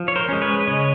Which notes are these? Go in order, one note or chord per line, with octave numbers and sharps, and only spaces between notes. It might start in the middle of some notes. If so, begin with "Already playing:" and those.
Already playing: F3
C#5
A#4 C5
G#3 C#4
B4 C#5
C#3 C#5 D#5